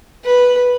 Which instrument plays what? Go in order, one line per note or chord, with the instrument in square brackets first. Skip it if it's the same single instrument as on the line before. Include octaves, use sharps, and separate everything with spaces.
[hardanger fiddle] B4